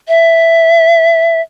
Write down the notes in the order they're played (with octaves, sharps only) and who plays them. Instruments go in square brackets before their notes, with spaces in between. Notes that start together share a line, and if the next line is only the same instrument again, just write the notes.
[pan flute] E5